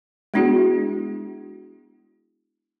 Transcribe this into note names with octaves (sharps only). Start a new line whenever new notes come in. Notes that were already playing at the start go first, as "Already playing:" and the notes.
G#3 B3 D4 E4 F#4 G#4